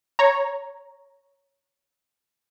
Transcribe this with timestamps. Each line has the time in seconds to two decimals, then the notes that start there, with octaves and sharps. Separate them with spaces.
0.19 C#5 A#5